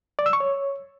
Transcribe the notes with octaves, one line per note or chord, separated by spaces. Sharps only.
D5
E6
C#6
C#5